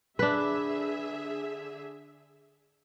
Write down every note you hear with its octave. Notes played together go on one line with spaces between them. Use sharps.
D3 D4 G#4 B4 E5